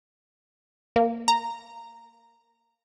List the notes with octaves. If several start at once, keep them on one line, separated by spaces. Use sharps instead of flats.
A#3
A#5